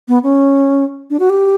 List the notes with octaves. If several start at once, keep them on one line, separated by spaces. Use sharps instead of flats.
B3
C#4
D4
F#4
G4